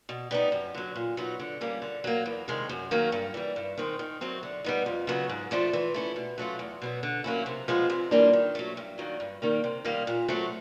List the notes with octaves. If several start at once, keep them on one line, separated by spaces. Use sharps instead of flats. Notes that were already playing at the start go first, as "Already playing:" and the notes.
B2
G3 B3 D#4
F#2
D3 F#3
A#2
F#3 B3 D#4
D3
G3 A#3 C#4
D3
F#3 A#3
E2
C3 D#3 G#3
F#2
D#3 F#3 A#3 C#4
G2
E3 G3
G2
D#3 G#3 C4
D#3
F#3 A3 C4
D3
G3 B3 D#4
F2
C#3 F#3 B3
G#2
F3 A3 D4
E3
A3 C#4 E4
B2
F#3 A3 C#4 F4
E2
B2 F#3 B3
D3
F#3 A#3 C#4 E4
C3
F3 G#3 B3
C3
E3 G3 A#3 D4
D#3
F#3 A3
G2
D#3 F#3 A#3 D4
G2
D#3 G3 A#3
C3
D#3 G3 A#3
A#2
F#3 A3 C4